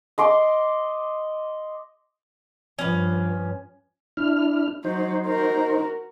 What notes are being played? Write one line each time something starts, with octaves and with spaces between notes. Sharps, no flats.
D#5 C6 D6
G2 F3 C#4 B4
D4 E4 F6
F#3 D#4 C5
F#4 A#4